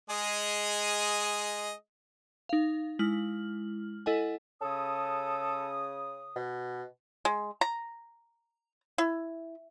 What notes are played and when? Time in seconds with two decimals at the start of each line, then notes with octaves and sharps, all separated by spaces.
0.10 G#3 G#4 D#5
2.49 D#4 F5
2.99 G#3 E4 F6 F#7
4.06 E4 A4 D#5 F#5 G#5
4.61 C#3 A4 D#6
6.36 B2
7.25 G#3
7.61 A#5
8.98 E4